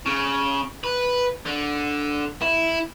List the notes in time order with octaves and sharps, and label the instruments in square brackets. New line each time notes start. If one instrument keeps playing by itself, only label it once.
[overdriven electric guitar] C#3
B4
D3
E4